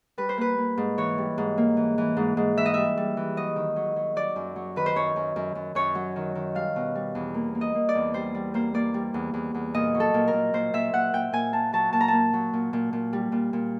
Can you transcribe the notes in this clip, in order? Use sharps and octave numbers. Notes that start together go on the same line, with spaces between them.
G3 B4
C5
A#3 B4
A#3
G#2
E3 C#5
G3
G#2
A#3
E3
E3
G#2
G#2
E3 E5
D#5
G3 E5
G3
E3
F#3 D#5
D#3
F#3
F#3
F#3 D5
F#2
F#3
D#3 B4
C5
F#2 C#5
F#2
F#2
F#2
F#2 C#5
F#3
D#3
D#3
G3 F5
B2
G3
E2
A#3
A#3
D#5
A#3
D5
E2
G3 C5
G3
A#3 C5
A#3 D5
G3
E2
E2
E2
A#2 D#5
F#3
A4
A#2
A#4
A#2
A#2 C5
A#2 E5
A#2 F#5
A#2 G5
A#2 G#5
A#3 A5
F#3 A5
A#2 A5
A#5
A#3 A5
F#3
A#2
A#2
A#2
G3
A#2
A#2